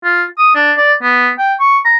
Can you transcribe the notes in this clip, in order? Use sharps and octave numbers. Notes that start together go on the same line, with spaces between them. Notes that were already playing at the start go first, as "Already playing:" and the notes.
F4
D#6
D4
D5
B3
G5
C#6
A#5